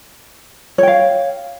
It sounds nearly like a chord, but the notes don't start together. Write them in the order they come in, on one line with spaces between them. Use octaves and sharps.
C#5 G5 F5